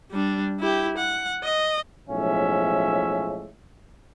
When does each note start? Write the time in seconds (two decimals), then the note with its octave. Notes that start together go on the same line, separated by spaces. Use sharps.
0.12 G3 D4
0.60 E4 G4
0.97 F#5
1.43 D#5
2.09 B1 A2 F3 G#3 C#4 E5